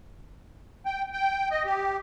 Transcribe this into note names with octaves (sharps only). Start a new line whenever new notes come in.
G5
G5
D#5
G4